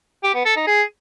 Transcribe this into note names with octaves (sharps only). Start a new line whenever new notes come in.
G4
B3
A4
D#4
G#4